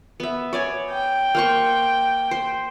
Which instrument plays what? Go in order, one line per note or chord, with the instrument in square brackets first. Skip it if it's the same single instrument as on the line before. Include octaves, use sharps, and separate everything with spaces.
[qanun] B3 E5
C#5 D5 G#5
[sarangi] G5
[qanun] A#3 C5 C#6
C5